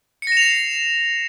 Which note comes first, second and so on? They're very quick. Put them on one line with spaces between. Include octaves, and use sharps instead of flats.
C#7 A#6 E7 F7 C7